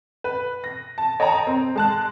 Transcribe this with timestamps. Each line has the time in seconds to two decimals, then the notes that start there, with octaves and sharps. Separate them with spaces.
0.24 B4
0.64 A#6
0.98 A5
1.20 C#5 D#5 G5 A5 A#5
1.47 C4
1.76 G#3 A5 F#6